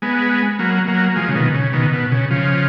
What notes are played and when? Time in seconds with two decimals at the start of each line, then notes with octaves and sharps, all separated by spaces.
0.02 G#3 B3
0.59 F#3 A#3
0.88 F#3 A#3
1.16 F3 G#3
1.28 C#3
1.35 B2 D#3
1.54 C#3
1.73 B2 D#3
1.93 B2
2.12 C#3
2.31 C#3 F3